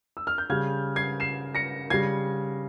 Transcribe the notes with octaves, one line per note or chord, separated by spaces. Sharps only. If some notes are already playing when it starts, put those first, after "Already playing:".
E6
F6
G6
C#3 G3 F6 G#6
G#6 C7
C7 E7
A#6 C#7
C#3 G3 G#6 C7